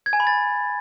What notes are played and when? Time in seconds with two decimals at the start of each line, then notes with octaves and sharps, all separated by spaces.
0.06 G#6
0.13 G#5
0.20 B5
0.27 A6